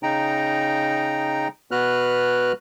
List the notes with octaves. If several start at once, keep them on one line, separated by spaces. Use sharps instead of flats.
C#3 D#4 G5 A#5
B2 B3 F#4 B4 F6 F#6